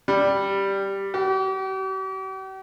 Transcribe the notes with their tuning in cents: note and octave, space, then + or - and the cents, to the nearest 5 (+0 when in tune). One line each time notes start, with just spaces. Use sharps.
G3 +0
G4 -45